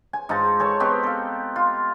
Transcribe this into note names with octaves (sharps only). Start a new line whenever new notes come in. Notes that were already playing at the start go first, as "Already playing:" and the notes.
G#5
G#2 D#4 F4 A5
A4 C#5 A5 C#6
B3 C4 D#4 G4
A4 F5
F4